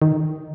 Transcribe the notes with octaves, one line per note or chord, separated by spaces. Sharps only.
D#3